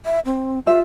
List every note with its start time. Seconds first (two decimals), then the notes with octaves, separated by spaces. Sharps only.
0.05 E5
0.26 C4
0.66 F4 G4 C5 E5